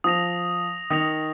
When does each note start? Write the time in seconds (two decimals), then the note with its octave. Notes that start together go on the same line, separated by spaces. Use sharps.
0.04 F3 D#6 A#6 F7
0.90 D#3 D#6 A#6 F7